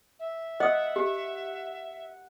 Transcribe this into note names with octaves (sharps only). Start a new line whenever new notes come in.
E5
D#5 F#5 D#6
G4